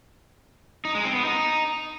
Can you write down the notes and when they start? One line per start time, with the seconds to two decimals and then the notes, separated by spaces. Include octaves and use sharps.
0.85 D#4
0.95 G#3
1.05 C4
1.15 B3
1.25 D#4